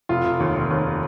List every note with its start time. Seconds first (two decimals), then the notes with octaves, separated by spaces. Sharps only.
0.09 F1 F4
0.25 F1
0.40 D#2
0.56 F1
0.71 D#2